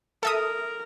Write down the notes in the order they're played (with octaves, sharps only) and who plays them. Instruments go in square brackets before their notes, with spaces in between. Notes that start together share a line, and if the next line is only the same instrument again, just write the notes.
[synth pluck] A4 E5 D#6 [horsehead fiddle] A#4